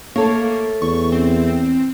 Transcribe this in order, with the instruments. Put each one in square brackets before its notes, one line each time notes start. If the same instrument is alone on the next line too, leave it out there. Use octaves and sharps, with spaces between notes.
[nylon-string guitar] A3 A4 C#5 [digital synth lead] A#3
[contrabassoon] E2 [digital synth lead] C#6
[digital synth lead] C4